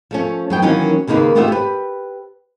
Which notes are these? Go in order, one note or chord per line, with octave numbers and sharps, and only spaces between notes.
F3 A3 C#4
F#3 B3 G5
D#3 E3 F#3 A#3 C#4 D#4
D#2 C#3 A#3 D#4 B4
A3 B3 F4 G4 D#5 E5
G4 B4